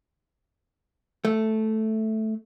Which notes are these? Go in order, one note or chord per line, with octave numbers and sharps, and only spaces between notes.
A3